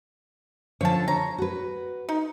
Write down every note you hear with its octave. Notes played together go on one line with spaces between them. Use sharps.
D3 F3 C#4 C#5 A5
C#5 A#5
F#4 B4
D#4